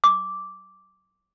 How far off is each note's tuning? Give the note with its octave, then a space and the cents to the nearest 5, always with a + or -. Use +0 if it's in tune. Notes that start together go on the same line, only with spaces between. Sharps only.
D6 -5